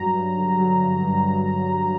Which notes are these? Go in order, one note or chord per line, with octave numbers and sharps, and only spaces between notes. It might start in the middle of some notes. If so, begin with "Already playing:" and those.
Already playing: G2 F#3 A#5
G2
D3
F#3
G2
G2